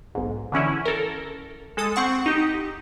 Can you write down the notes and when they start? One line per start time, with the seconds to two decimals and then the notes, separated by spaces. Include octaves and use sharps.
0.15 B1 G#2
0.52 D3 E3 C#4 E4
0.86 A4 A#4
1.77 G#3 A4 D#6
1.96 C4 F#5 C#6
2.26 D#4 G4